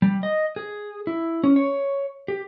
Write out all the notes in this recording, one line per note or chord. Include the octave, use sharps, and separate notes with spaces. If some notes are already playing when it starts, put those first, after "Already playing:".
G3
D#5
G#4
E4
C#4
C#5
G4